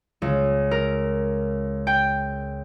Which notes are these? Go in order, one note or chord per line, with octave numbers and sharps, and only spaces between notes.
C#2
A#4
G5